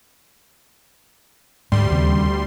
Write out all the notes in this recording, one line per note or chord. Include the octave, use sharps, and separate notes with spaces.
D2 G#2 G3 C6
D#2 C#3 C4